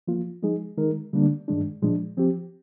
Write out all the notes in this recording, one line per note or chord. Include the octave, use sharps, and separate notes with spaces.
F3 A#3 F4
F3 G#3 D#4 G#4
D#3 G#3 D#4 A#4
D3 G3 A#3 D4
G2 D#3 G#3 D4
A#2 F3 G#3 D4
F3 C4 G4